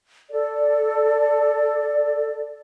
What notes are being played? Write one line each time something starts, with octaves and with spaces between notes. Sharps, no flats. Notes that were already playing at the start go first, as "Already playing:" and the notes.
A4 D5